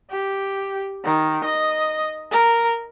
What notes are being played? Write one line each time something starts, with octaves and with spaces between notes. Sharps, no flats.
G4
D#3
D#5
A#4